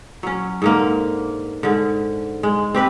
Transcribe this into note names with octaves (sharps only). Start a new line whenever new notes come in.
F#3 C#4
G#2 D3 A#3
G#2 D3
G#3
C4 G4 B4